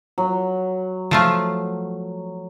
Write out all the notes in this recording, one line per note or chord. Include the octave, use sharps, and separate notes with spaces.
F#3
F3 A3 F4